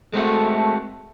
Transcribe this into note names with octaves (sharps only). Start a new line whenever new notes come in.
G#3 A3 C4 F#4